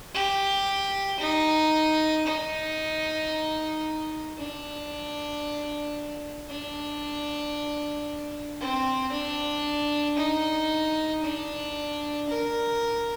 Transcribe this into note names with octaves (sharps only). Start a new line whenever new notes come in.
G4
D#4
D#4
D4
D4
C4
D4
D#4
D4
A#4